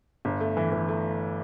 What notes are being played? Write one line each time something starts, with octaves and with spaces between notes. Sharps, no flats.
G1
A3
E3
E3
A3